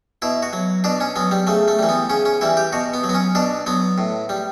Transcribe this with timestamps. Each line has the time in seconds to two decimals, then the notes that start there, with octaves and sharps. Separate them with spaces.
0.22 B2 E4
0.43 F#4
0.53 F#3
0.84 B2 D4
1.00 C#4
1.16 F#3 B3
1.31 G3
1.47 C#3 A3
1.68 A3
1.79 E3 G3
1.89 B3
2.10 C#3 C#4
2.25 C#4
2.41 E3 G3 E4
2.57 G4
2.73 B2 F#4
2.94 B3
3.04 F#3
3.09 B3
3.14 C#4
3.35 B2 D4
3.66 F#3 B3
3.98 A2
4.29 G3